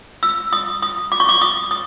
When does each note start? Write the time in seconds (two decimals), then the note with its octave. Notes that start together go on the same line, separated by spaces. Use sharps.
0.23 E6
0.53 D#6
0.82 D#6
1.12 D6
1.20 C#6
1.29 D6
1.41 D#6
1.71 D#6